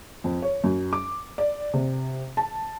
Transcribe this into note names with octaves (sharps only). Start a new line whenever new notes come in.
F2
C#5
F#2
D6
D5
C3
A5